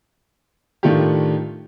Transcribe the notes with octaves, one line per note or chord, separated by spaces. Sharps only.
A2 D#3 A3 D4 F4 G4